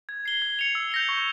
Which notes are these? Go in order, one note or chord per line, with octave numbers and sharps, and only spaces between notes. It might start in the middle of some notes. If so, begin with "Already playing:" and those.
G#6
C7 G7
G#6
C#7 F7
E6
G6 A#6 F7
C#6